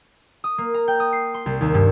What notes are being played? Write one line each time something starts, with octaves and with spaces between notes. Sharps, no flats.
D#6
A#3
A#5
G5
D#6
C7
C6
C2
D#2
G2